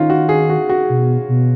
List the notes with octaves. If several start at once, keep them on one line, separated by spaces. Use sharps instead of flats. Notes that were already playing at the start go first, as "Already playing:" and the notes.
Already playing: D#3 C#4 D#4 F4
F#4
G#4
F#4
F#4
B2
B2